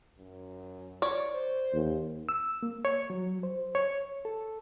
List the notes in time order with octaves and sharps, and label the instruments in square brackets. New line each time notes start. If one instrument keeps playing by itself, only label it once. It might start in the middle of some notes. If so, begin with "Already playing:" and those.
[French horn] F#2
[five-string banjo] C#5 D5
[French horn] C5
[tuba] D#2
[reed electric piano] E6
A#3
C#5
F#3
C5
C#5
A4